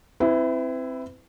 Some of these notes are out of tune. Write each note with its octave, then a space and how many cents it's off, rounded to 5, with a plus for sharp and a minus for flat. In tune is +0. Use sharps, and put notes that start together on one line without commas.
C4 +0 E4 +0 B4 +45